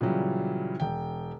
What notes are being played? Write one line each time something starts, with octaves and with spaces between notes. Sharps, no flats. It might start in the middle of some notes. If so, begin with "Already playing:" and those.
A#2 C#3 E3 F#3 G3
E1 G5